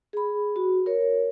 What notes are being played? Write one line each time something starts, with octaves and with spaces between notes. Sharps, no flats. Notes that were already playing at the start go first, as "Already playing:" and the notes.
G#4 B5
F#4
A#4 C#5